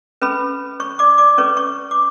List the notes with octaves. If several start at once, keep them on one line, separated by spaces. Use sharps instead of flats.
C#4 G#4 B4 B5
C#5 C#6
D5 D6
D5 D6
C#4 G#4 B4 C#5 C#6
C#5 C#6
D6